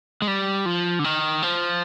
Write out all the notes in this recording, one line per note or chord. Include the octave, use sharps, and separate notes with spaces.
G#3
G3
F3
D3
D#3
F3